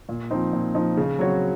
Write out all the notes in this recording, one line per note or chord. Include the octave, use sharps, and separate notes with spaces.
A#2
F3 C4 D#4
A#2
F3 C4 D#4
C#3
F#3 C4 F#4 C#5